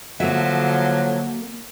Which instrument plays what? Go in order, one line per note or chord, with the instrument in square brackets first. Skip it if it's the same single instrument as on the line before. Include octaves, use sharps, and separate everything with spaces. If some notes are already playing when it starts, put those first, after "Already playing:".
[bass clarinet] D3 [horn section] F3 F#3 [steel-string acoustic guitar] A#3 E5